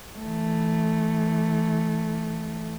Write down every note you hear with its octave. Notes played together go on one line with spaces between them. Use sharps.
E3 A3